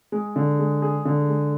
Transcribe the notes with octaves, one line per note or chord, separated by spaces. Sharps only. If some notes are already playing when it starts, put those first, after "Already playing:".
G#3
D3
G#3
G#4
D3
G#3